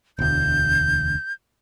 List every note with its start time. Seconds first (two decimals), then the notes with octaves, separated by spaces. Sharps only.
0.19 E1 D2 G6